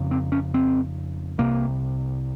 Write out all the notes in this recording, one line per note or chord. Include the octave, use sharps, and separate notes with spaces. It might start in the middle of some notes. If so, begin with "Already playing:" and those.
Already playing: F2 C#3
C4
C#4
C4
C2 C3 A#3